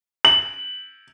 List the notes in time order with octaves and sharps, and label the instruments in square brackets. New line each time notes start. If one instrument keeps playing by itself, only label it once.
[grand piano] F#7